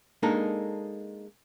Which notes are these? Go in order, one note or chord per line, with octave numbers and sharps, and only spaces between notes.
G#3 A#3 D4 D#4 A4